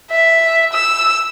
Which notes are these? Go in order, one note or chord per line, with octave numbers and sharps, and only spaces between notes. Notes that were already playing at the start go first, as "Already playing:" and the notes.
E5
E6